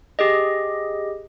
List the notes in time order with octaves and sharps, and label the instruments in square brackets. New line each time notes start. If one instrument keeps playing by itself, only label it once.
[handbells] G4 G#4 D#5